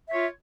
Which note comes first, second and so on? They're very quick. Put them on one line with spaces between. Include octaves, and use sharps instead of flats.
E5 C#5 F4